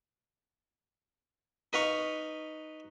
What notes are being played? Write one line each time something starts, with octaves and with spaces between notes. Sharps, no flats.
D#4 B4 F5 C#6